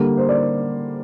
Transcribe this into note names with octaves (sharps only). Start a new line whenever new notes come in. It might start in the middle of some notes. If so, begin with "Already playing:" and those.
Already playing: D3 G3 A#3
C5
D5